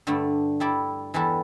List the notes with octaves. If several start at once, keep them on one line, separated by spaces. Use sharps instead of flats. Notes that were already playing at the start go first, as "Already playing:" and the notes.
G2 D3 A3 D4
G3 E4 A4 D5
E2 E3 G3 E4 A4